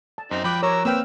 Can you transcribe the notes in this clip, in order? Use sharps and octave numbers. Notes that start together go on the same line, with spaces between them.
A5
F#2 C4 D#4
F3 G5 B5 D6 F#6
A#4 C#5 A#5 E6
A#3 C4 B4 G5 E6 F6